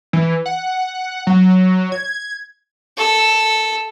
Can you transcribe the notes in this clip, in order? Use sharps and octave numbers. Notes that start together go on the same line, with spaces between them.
E3
F#5
F#3
G#6
A4